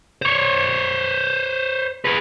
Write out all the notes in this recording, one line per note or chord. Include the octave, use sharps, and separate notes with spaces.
C5 C#5
G#4 B4